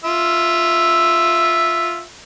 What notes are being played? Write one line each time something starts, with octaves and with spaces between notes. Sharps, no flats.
F4 E5